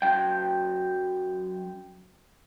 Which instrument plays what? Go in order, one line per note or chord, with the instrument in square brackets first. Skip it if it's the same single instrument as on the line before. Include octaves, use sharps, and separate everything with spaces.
[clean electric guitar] F#2 F#3 G5